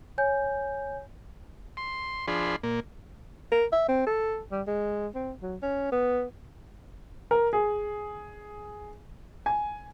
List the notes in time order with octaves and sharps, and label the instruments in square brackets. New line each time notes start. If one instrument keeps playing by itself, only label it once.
[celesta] C#5 G#5 G6
[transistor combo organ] C6
F3 D4 G#4 B5 C6
A#2 A#3
[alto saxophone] A#4
E5
C4
A4
G3
G#3
C4
F#3
C#4
B3
[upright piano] A#4
G#4
G#5